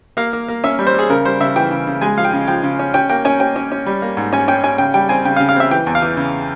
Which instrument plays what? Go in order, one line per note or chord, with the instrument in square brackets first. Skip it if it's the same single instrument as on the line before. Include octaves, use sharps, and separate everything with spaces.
[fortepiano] A#3 F5
A#3
A#3
C#4 E5
G3
C5
G3
G#4
C#3 A#4
G3 C5
C#3 E5
E3 G5
C#3
C#3
G#3 G#5
F3 F5
G5
C#3
F3 G5
C#3
C#4
C#4 G5
A#3 G5
C#4 G#5
C#4 G5
C#4
C#4
G3
A#3
G#2
C#4 G#5
C#4 G5
C#4 G#5
C#3 G5
G3 G5
C4 G#5
C#3 G5
F5
C#3
F5
C4 E5
E3 G5
E2
F5
E3
C#3